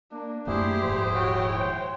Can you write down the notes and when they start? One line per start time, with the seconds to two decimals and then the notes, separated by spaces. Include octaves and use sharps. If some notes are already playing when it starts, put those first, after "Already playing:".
0.12 A#3 D4
0.47 F#2 A3 A#3 E4 G4 G#4 C5
0.83 D#1 G#2 F3
1.15 F#4 C#5 G5
1.57 C5